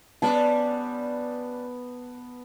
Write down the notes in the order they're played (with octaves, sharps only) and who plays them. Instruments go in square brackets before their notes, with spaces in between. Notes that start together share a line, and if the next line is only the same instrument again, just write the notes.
[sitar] G3 C#4 D4 [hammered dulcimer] B3 A5